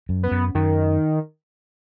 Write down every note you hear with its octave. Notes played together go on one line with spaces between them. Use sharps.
F#2
B3
F#2
F#2 D#3